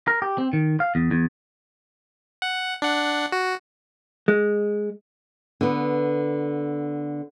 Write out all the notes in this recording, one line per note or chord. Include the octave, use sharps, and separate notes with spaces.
A#4
G4
C4
D#3
F5
E2
E2
F#5
D4 F#5
F#4
G#3
D3 B3